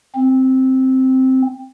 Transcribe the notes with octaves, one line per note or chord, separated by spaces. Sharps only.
C4